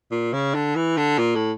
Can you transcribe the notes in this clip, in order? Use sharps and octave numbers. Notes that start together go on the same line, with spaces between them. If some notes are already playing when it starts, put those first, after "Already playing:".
A#2
C#3
D3
E3
D3
A#2
A2